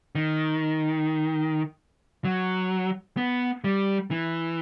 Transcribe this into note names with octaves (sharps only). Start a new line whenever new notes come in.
D#3
F#3
B3
G3
E3